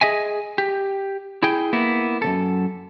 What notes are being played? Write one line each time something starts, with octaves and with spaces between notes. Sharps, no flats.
G#4 D#5 E5 G#5
G4
E4 G#4 G5
A#3 B3 E4
F#2 C#3 A4